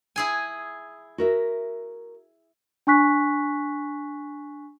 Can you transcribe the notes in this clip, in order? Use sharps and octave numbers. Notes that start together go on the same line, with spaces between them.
E4 G#4 G#5
F#4 A#4 E5
D4 G#5 C#6 F#6 B6